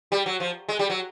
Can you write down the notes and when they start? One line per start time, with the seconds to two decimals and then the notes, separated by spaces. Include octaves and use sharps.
0.12 G3
0.26 F#3
0.40 F3
0.69 G#3
0.79 G3
0.90 F#3